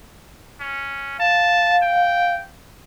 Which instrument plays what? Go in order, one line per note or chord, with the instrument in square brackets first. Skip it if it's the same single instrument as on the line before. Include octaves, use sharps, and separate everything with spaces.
[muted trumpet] C#4
[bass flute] F5 [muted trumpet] A5
[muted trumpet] G5